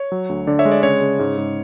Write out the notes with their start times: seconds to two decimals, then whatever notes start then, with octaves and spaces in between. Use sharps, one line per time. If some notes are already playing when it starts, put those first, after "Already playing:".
Already playing: C#5
0.12 F#3
0.29 D2
0.47 D3 D5
0.59 C#5 E5
0.65 G#3
0.71 D5
0.83 C#3 C#5
1.01 C#3
1.19 G#2
1.38 G#2